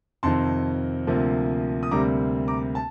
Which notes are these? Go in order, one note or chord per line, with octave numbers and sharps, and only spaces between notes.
F2 C3 D#3 A5 C6
D2 C3 F3 A#3
D#6
D2 C3 G3 A#3 A#5 D6
A#5 D6
A5